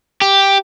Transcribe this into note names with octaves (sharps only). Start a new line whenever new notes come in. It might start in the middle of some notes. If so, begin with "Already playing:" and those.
G4